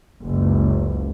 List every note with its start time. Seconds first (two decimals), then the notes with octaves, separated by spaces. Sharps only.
0.24 F#1 C#2